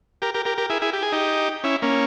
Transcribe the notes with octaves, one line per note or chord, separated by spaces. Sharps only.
G4 A#4
G4 A#4
G4 A#4
G4 A#4
E4 G#4
E4 G#4
G4
G#4
D#4 G4
C#4 E4
A#3 C#4